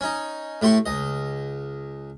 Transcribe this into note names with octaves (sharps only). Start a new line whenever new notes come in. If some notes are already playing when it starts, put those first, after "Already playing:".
C#4 D#4
A2 A3 G4 C6 C#6
C#2 D#5